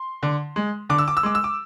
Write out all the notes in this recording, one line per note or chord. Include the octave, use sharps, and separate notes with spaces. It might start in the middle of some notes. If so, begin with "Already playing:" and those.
Already playing: C6
D3
G#3
D3 D6
E6
D6
E6
G#3 D6
E6
D6